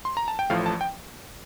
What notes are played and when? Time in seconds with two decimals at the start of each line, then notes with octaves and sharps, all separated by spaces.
0.05 C6
0.17 A#5
0.28 A5
0.39 G5
0.50 A1 A2 F3 A3 F5
0.66 A5
0.81 G5